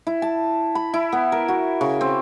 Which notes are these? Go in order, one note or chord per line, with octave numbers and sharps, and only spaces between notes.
E4
A5
B5
E4
B3
A#4
F#4
C#3
C4